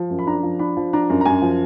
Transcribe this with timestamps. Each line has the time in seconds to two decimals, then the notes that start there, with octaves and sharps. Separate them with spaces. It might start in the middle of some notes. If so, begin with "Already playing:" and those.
Already playing: F3
0.10 F#2
0.19 B5
0.27 D4 A#5
0.43 F3
0.59 D4 B5
0.77 F3
0.93 D4 A#5
1.10 F#2
1.21 A#5
1.25 F#2 G#5
1.42 F3